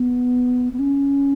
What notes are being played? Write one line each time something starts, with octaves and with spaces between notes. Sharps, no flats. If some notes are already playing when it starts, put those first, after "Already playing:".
Already playing: B3
B3
C#4